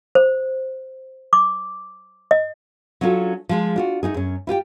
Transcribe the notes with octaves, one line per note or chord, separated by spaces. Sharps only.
C5
D6
D#5
F#3 C#4 D4 F4 F#4 A4
F3 G#3 F4
D4 F4 F#4
A3 B3 D#4 G#4
F#2 C#4
E4 F4 G4 G5